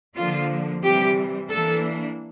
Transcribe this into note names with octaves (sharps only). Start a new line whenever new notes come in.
D3 F3 A#3 F4
C3 E3 G3 G4
E3 A#3 D4 A4